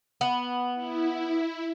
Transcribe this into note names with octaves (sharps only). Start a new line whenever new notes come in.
B3
E4